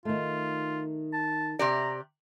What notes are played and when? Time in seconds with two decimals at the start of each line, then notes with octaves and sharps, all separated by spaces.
0.05 D#3 A3 F4
1.13 A5
1.59 C3 G4 D5 A#5